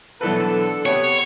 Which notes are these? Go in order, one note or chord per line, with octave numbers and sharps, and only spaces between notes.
B1 D3 E3 A4 B4
C3 B3 C#5